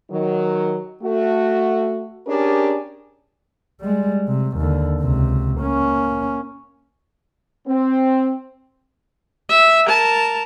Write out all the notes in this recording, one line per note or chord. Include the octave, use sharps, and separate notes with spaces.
D#3 F#3
A3 F#4
C#4 D4 G4 G#4 A#4 D5
G3 G#3
C3
D#2 D3
C#2 C3
A#3 C#4
C4
E5
A#4 A5